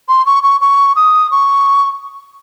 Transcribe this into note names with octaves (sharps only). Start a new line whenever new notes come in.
C6
C#6
C#6
C#6
D#6
C#6